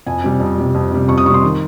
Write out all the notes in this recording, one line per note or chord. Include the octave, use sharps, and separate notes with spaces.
F2 G#5
C3 G3
F2
C3 G3
F2
C3 G3
F2 C#6
D#6
C3 G3 C6 C#6
D#3